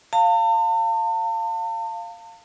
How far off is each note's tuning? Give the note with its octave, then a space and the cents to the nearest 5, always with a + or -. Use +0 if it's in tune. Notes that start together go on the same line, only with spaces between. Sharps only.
F5 +0 A5 +40